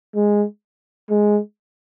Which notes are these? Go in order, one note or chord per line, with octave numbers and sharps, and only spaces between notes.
G#3
G#3